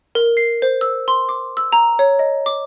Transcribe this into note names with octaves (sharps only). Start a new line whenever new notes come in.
A#4
C7
C5
E6
C6
D6
E6
A#5
C#5
D#5
D6